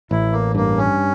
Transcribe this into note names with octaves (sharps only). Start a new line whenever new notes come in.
A1 E4
A#3
G2 A#3
C#4